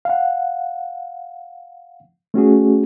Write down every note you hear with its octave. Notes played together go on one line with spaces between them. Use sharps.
F5 F#5
A3 C#4 F#4 G#4